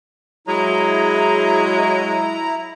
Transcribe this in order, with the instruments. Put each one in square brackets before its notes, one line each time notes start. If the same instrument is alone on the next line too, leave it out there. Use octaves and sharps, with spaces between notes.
[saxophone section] F#3 G#3 [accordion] E4 A#5